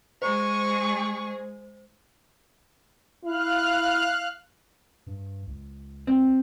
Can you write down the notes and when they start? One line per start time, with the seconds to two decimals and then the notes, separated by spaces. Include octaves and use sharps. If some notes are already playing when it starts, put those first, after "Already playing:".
0.22 G#3 G#4 C5 C#6
3.24 E4 F5 F6 F#6
5.06 G2
5.47 C#2
6.07 C4